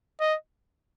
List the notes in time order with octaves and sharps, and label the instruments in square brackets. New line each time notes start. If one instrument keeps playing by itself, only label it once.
[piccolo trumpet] D#5